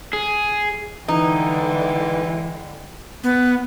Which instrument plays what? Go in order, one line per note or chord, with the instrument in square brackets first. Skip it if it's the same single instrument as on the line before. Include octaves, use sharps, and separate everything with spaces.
[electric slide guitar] G#4
[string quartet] D3 G3 G#3 [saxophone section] E3 [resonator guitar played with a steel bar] D#4
[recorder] B3